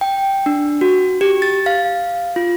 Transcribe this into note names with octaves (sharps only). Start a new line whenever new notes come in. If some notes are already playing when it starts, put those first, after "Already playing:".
G5
D4
F#4
G4
A6
F5
F4